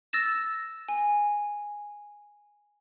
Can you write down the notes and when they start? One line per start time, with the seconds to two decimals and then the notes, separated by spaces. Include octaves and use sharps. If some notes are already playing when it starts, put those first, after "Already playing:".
0.13 E6 A6 A#6 E7
0.89 G#5